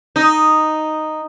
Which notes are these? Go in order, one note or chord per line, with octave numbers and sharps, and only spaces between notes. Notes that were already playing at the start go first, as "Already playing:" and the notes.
D#4